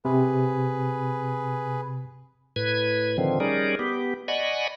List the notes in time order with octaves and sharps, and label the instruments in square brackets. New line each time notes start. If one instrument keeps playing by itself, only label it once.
[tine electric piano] C3 [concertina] G#4 B4
[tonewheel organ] A2 B4 G#6
D3 D#3 F3 C4
G3 C#4 D#4 G#4 A#4 D5
B3 G4
D5 D#5 F#5 G#5 B5 C#6